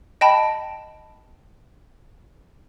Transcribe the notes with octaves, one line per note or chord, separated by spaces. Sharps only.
D#5 G5 A5 B5